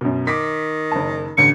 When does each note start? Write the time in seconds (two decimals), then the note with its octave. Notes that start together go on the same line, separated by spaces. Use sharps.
0.01 F#2 B2
0.27 D#3 D6 B6
0.92 F#1 A5
1.38 A1 D3 C#7